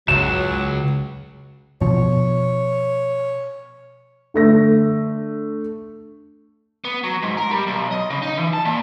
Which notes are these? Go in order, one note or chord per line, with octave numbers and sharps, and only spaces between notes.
C#2 F#3 E7
B2 F3 C#5
D3 A3 A#6
B3
F#3
G#2
A#4
G3
B1
D#5
C#3
D#4
E3
A5
A#2